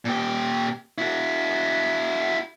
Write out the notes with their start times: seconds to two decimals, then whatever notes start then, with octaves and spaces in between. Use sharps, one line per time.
0.05 A#2 G4
0.98 E4 F#4